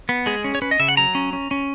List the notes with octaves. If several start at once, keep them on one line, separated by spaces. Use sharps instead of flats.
B3
G#3 G#4
C#4
C#5
C#4 B4
D#5
C#3 E5
F#5
F#3 A#5
C#4
C#4
C#4